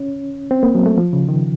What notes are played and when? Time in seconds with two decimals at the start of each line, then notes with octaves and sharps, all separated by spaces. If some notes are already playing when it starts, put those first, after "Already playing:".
Already playing: C#4
0.51 C4
0.63 A#3
0.75 F#3
0.86 A3
0.98 F3
1.13 C#3
1.28 D#3